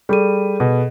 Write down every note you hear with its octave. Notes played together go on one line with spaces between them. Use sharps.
G3 G#4 A4 D#7
B2